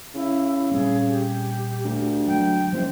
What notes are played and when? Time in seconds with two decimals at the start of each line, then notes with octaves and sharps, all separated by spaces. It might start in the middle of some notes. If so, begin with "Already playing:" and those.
0.15 C#3 E4
0.72 A#2 G3 C4 G#4
1.09 G4
1.85 D2
2.28 F#3 G#3 G5
2.72 F#1 F3 G3 C5